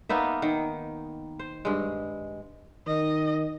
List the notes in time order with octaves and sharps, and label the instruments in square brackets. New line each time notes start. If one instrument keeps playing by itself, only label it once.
[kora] A#3 B3 D#4 E5
D#3
C5
G2 G#3
[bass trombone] D#3 [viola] D#5